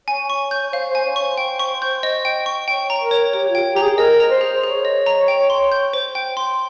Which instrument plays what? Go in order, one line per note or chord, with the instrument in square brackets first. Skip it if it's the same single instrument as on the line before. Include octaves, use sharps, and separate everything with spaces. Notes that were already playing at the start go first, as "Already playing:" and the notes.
[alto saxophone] C#5 [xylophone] G#5
[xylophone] C#6
G6
[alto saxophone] C#5
[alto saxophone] C5 [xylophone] F5
[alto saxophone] C5
[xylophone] G#5
[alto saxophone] C#5
[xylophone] C#6
[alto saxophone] C5
[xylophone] G5
C#6
G6
D#5
G5
C#6
[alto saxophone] C#5 [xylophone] G5
[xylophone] A#5
[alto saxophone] A#4
[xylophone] C#5
[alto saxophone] G4 [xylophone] C#5
[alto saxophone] F4
[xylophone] G5
[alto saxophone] G4 [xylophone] A#5
[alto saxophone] G#4
[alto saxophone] A#4 [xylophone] D#5
[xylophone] A#5
[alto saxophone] C5
[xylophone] G#4
[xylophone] G#4 [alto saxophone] C#5
[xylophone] D#5
A#5
G5
C6
G6
C5
G5
C6